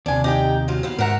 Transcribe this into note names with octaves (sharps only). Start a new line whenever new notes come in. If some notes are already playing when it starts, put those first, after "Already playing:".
D#2 C3 D4 G#5
D#4 G4 G5
G2 F#3 F4
D#2 B3 F5
G#2 A#4 E5 F#5 A#5